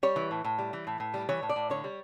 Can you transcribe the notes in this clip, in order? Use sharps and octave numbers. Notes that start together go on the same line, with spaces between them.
G3 C#5
E3
A2
A2
G3
E3
A2
A2
G3
E3 C#5
A2
D5
A2
D3 C#5
G3